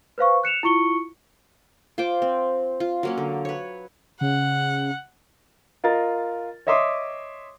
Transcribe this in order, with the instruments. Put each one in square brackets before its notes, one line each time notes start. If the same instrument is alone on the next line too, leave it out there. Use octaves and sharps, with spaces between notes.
[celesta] B4 C5 F5 C#6
F#6 C#7 E7 F7
E4 F4 C#6 C#7 G7
[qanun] F4 C5 G5 D6
C4
F4
F#3 A#3 C#4
D3
B4 C#5
[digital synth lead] C#3 [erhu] F#5
[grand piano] F4 A#4 D#5 A6
C#5 D#5 E5 C6 D6 D#6